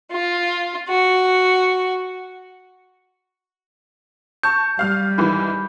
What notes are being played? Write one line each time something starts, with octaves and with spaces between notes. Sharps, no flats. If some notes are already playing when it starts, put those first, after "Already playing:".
F4
F#4
A5 C#6 G6
G3 F5 F6
G#2 D#3 E3 B5